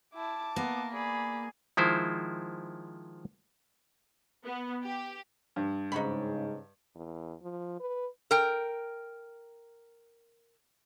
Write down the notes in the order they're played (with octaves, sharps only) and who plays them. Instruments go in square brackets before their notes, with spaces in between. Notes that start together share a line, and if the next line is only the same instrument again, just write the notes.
[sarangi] E4 [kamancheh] A5 D6
[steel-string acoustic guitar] A#3 [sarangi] B3
[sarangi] G#4 [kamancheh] D5 B5
[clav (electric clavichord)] D#3 F3 G#3 E4 C5
[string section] B3
G4
[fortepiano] G2
[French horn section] G#2 C#3 [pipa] D#4 F#4 B5
[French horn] E2
F3
B4
[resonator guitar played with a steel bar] A#4 G5